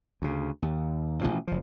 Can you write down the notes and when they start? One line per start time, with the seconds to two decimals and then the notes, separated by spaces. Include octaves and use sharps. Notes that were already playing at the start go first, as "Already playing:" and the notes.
0.22 D2 C#3
0.62 D#2
1.21 A1 G2 B2 F3
1.47 F#1 F3